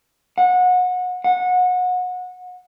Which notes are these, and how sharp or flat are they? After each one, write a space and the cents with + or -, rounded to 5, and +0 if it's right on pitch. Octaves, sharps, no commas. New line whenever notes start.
F#5 -25
F#5 -25